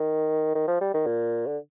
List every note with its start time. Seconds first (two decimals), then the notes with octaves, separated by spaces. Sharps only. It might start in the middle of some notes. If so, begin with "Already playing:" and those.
Already playing: D#3
0.55 D#3
0.68 F3
0.81 G3
0.94 D#3
1.06 A#2
1.46 D3